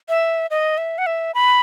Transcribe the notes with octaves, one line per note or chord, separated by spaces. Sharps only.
E5
D#5
E5
F#5
E5
B5